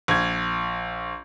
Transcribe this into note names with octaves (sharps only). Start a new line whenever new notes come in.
A#1 G#6